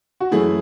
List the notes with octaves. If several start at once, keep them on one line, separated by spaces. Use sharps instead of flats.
F#4
F#2 E3 A3 E4 G#4